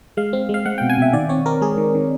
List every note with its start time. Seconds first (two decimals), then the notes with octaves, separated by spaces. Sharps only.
0.17 G#3 F5
0.33 C4
0.49 G#3
0.54 F5
0.66 G#3 F#5
0.78 B2 G5
0.90 G#5
0.98 B2 E5
1.13 D#3 D5
1.29 C4 C#5
1.46 C4 A#4
1.61 G#3 G#4
1.77 D#3
1.95 D#3